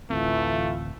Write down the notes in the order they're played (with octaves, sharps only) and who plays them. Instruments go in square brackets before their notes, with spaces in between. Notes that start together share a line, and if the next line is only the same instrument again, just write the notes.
[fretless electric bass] A1 D2 C4 [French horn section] E3 F4 [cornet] A3